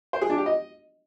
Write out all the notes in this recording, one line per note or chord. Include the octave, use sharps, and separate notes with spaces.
C5
G#4
D4
G4
D#5